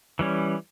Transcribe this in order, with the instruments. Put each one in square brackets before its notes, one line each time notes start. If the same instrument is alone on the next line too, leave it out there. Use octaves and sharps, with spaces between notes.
[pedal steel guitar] E3 G3 C#4